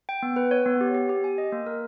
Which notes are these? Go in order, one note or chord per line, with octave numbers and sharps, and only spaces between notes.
G5
B3
B4
C#5
B3
G4
G4
G4
G#5
D#5
A#3
A#4